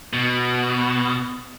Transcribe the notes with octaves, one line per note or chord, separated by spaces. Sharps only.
B2